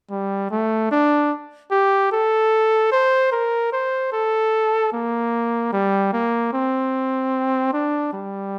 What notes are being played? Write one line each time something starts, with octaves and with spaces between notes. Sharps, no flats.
G3
A3
D4
G4
A4
C5
A#4
C5
A4
A#3
G3
A#3
C4
D4
G3